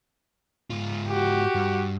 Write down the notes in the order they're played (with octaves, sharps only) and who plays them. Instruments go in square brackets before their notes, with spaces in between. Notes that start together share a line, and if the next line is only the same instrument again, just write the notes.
[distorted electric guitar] G#2 F4
[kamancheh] F#4 G4
[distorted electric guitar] G2